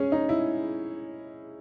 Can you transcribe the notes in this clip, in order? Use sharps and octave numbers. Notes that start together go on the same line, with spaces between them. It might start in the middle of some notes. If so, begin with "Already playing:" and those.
Already playing: C#4 G#4
D#4
E4